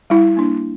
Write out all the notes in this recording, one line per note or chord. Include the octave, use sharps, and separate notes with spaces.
G3 E4
A#3 D4